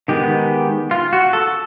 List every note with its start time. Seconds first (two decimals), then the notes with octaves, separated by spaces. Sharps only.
0.08 D#3 G#3 B3 G4
0.91 F4
1.13 F#4
1.33 A4